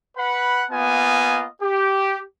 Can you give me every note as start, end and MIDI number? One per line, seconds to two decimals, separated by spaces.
0.17 0.65 71
0.17 0.65 78
0.17 0.65 83
0.71 1.46 58
0.71 1.46 59
0.71 1.46 65
0.71 1.46 75
0.71 1.46 77
0.71 1.46 80
1.62 2.23 67